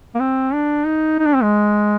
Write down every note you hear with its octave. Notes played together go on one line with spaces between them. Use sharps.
A#3
C4
D4
D#4
D#4
D4
C4
G#3